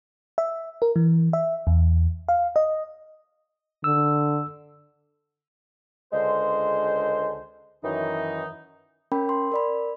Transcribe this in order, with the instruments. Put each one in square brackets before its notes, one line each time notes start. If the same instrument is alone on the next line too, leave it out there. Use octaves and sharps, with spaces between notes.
[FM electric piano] E5
A#4
E3
E5
E2
F5
D#5
[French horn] D3 [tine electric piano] E6
[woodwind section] C#2 D3 G#3 C5
F#2 D#3 E3 D#4
[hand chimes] C#4 A#4 G5 B5
C6
A#4 D5 B5